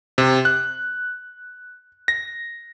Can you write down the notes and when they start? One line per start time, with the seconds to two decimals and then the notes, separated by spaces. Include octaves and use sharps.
0.18 C3
0.45 F#6
2.08 A#6